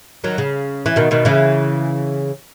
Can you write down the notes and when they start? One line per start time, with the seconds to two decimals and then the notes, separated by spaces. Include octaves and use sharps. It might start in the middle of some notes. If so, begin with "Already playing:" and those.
0.24 D#3 F#3
0.38 C#3
0.86 E3
0.96 B2 D#3
1.11 B2 D#3
1.25 C#3 E3